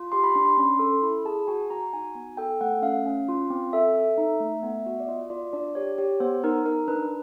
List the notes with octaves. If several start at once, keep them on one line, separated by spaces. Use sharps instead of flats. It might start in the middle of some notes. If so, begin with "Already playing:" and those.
Already playing: F4
G4 C6
B5
D4 C6
C6
C#4 C6
A4
E4 B5
G#4 A5
F#4 G#5
F#4 A#5
D#4 G#5
B3
A4 G5
A3 F#5
C#4 F5
C#4
F4
C4
A4 E5
A4
D#4
A3
B3
F#4
D5
F4 D#5
F4 D5
D4 D5
G4 C#5
G4 C#5
B3 C5
D#4 A#4
D#4 A#4
D4 B4